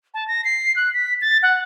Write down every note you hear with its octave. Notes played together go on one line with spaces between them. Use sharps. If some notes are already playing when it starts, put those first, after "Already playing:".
A5
A#6
C7
F#6
B6
A6
F#5